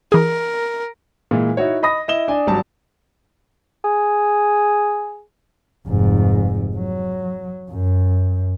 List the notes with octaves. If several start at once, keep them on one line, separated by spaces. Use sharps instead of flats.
E3 G#4 A#4
A#2 E3 G#3
D#4 E4 F#4 C#5
D#5 B5 D#6 A#6
E4 D#5 E7 G7
D4 D5 G#5
G#1 F#3 G3 D5 A5
G#4
F1 G#2
F#3
F#2